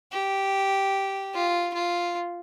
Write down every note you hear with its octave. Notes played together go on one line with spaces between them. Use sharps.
G4
F4
F4